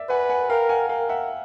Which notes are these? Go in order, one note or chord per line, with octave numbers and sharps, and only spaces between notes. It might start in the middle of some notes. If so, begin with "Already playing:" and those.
Already playing: D5 E5
B4 F#5 G#5
F#5 G#5
A#4 F5 G5
F#5 G#5
A#4 F5 G5
E5 F#5